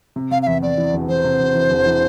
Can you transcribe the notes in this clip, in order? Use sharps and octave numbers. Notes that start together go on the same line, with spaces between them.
C3
C3 F5
F5
E2 E5
E2 D5
E3
E1
E1 C5
C3
E1
E3
E1
E3